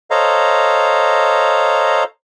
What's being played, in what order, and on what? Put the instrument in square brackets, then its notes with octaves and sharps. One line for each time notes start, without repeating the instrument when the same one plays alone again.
[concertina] A4 C5 C#5 D#5 F5 A#5